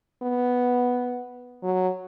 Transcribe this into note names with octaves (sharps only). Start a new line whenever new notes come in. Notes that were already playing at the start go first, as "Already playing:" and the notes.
B3
F#3